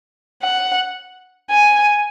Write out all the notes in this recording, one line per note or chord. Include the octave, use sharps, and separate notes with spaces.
F#5
G#5